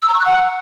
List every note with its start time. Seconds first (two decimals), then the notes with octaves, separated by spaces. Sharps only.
0.02 E6
0.08 A#5
0.14 C#6
0.20 F#6
0.25 F#5